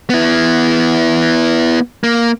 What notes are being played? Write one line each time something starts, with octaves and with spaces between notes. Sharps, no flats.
B3 E4
A#3